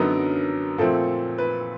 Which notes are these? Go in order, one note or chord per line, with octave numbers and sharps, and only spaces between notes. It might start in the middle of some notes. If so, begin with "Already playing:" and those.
Already playing: F#2 D3 F#3 B3 D#4 A#4
A#2 F3 A3 C4 A4
B4